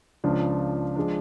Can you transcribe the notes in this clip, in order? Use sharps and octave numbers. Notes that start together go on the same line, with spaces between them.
C#2 C#3 F3 D4
F3 G#3 D4